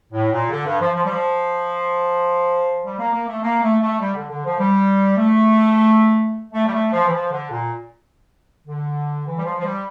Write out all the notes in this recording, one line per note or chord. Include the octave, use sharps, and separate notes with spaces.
A2
A#2
C#3
D3
G2
F3
F3
G3
F3
G3
A#3
A#3
A3
A#3
A3
A3
G3
D3
D3
F3
G3
A3
A3
G3
A3
F3
E3
F3
D3
A#2
D3
E3
G3
F3
F3
G3